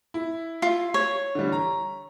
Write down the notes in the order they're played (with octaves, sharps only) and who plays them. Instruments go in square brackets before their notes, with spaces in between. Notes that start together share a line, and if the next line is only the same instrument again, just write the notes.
[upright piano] E4
[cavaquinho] F4
C#5
[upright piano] D3 E3 G3
A#5